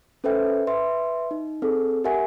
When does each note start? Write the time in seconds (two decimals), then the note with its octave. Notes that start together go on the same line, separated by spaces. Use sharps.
0.24 C#4 A4 B4 C5 E5 G5
0.67 B4 E5 C6
1.31 D#4
1.62 C4 G#4 A4
2.04 G4 A#4 E5 F#5 G#5